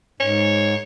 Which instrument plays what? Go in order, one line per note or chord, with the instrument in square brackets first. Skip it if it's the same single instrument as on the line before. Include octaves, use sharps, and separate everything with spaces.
[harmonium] G#2 [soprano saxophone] C#5